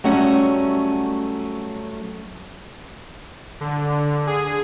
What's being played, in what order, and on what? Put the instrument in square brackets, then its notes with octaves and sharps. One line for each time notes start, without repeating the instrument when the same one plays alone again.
[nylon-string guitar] F#3 G3 A3 C#4 F#5
[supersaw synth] D3
G#4